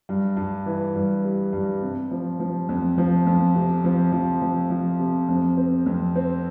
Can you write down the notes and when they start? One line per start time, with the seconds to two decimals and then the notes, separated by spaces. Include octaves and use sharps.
0.09 G2
0.37 G2
0.66 E3
0.95 G2
1.24 G3
1.53 G2
1.82 C3
2.11 F3
2.40 F3
2.69 F2
2.98 F3
3.27 F2
3.55 C3
3.84 F3
4.12 F3
4.42 F3
4.70 F3
4.99 C3
5.29 F2
5.57 C4
5.86 F2
6.16 C4